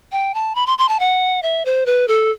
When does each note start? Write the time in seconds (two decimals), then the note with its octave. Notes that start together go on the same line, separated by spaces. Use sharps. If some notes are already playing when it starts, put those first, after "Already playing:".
0.12 G5
0.34 A5
0.55 B5
0.66 C6
0.78 C6
0.89 A5
1.00 F#5
1.42 E5
1.65 C5
1.86 B4
2.08 A4